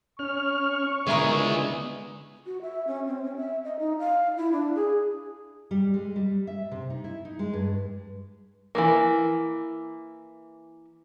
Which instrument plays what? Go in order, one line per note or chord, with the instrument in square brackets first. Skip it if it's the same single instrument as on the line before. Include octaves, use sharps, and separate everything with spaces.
[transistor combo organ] C#4 F6 [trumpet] C#6
[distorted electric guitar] C#2 G#4 [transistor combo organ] D3 B3 [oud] G#3 E4 A#4
[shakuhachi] F#4
E5
C#4
C4
C#4
E5
D#5
D#4
F5
E4
D4
G#4
[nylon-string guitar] G3
G#3
G3
E5
C3
D#4
E4
D#4
G#3
G2
[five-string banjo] E3 F#3 A#3